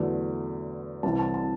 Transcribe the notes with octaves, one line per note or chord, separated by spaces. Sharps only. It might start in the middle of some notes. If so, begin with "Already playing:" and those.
Already playing: E2 D3 F#3 A3 D4
C2 C3 E3 A5
A5
A5